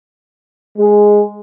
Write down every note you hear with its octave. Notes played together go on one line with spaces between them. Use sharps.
G#3 G#4